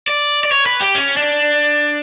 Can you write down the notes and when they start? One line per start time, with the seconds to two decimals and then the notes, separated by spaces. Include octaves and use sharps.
0.08 D5
0.44 D5
0.52 C#5
0.66 B4
0.81 G4
0.95 C#4
1.17 D4